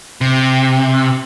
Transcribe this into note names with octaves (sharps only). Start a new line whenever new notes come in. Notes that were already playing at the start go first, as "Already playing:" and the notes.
C3